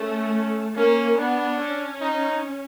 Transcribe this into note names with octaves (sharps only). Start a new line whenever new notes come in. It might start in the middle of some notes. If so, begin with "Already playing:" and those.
Already playing: A3 C#4
A#3 C#4
B3 D4
C#4
D#4